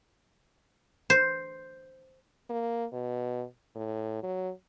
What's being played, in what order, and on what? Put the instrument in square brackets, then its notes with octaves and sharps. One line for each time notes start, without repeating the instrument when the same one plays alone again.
[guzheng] C5
[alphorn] A#3
B2
A2
F#3